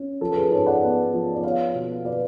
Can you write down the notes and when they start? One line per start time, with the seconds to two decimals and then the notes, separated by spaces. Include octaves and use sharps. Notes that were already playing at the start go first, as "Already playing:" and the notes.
Already playing: C#4
0.21 F3 A4
0.32 A4
0.36 G#4 B4
0.51 G#2 A4 C#5
0.66 D5 F#5
0.82 B3
1.13 F3
1.35 D5
1.44 B3 C#5 F5
1.74 B2
2.05 B2 B4 D5